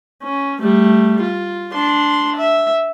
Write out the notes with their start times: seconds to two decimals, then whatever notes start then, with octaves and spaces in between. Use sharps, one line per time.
0.23 C#4
0.61 G3 A3
1.22 F4
1.73 D4 C6
2.37 E5